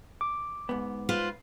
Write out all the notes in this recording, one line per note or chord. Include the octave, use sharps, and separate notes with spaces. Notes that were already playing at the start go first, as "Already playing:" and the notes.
D6
G#2 B3
F4 B4 C5